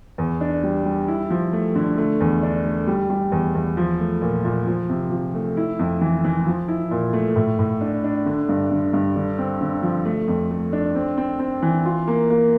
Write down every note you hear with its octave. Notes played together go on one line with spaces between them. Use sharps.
E2
D4
G3
G3
E4
F3
A3
D3
A3
E2
D4
A3
G3
G3
E2
E2
F3
A3
A#2
A#2
F3
C3
F3
A3
E4
F2
E3
E3
F3
E4
A#2
A3
A2
A2
D4
D4
D3
G2
D3
G2
D3
C4
D3
F3
A3
F2
A3
D4
C4
C4
C4
E3
F4
A#3
A#3